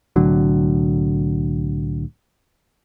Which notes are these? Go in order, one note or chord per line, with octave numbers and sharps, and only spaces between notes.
C2 A2 D3 F#3